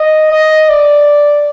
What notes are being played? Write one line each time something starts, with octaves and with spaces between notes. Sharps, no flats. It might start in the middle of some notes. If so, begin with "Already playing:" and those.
Already playing: D#5
D#5
D5